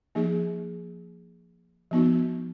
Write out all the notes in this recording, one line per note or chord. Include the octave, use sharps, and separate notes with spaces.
F3 A#3 D#4 G#4
F3 B3 D#4 F#4